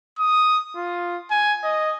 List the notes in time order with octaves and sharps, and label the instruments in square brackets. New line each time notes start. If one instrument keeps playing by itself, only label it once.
[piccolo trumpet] D#6
F4
G#5
D#5